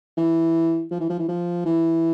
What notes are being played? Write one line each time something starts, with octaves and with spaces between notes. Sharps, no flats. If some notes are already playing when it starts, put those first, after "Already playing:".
E3
F3
E3
F3
E3
F3
E3